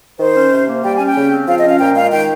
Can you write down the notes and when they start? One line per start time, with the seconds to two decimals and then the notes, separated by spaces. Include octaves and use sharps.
0.19 D#3 C5
0.36 C#4
0.52 C3
0.68 A#3
0.83 G3 G5
0.95 C#4 G#5
1.06 G5
1.16 C#3
1.31 C4
1.47 F3 F5
1.58 D#5
1.64 C#4
1.69 F5
1.79 A#2 G5
1.95 G#3 F5
2.11 D#3 G5